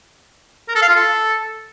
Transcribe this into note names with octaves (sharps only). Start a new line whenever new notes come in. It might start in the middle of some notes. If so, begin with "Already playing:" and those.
A#4
A4
F5
F4
A4